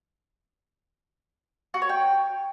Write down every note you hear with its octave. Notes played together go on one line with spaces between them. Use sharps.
F#4
C#5
G5